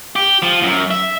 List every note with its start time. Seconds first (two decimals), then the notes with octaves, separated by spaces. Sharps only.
0.16 G4
0.42 F3
0.63 F#2
0.91 E5